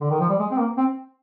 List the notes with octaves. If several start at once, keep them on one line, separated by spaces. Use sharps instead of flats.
D3
D#3
F3
G3
G#3
C4
A#3
C4